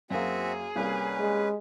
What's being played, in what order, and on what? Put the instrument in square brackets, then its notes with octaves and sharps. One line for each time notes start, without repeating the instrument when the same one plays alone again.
[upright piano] F#2 A#3 [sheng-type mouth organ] C4 F#4 E5 [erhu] G#4
[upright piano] C2 A#3 [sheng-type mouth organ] C#4 B4
[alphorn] G#3